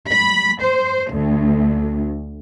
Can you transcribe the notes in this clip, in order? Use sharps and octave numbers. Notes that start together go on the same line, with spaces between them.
B5
C5
D2